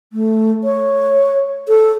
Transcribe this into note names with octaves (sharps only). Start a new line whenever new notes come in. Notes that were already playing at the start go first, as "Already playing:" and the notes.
A3
C#5
A4